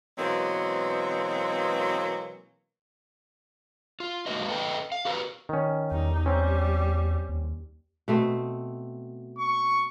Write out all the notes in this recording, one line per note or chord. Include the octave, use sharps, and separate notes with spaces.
B2 E3 F#3 G#3 A#3 C4
F4
G#3 A#3 D#4 F#4 B4 D#5
A4 B4 D#5 G5 A5
F5
F#4 G4 A#4 B4
D#3 C#4
E2 G3 D#4
G3 C4 C#4
D#2
B2 A3 C4
C#6